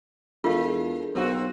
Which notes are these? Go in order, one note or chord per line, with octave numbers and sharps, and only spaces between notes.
E2 G#3 D4 F4 A4 A#4 F5
B1 A#3 C4 F#4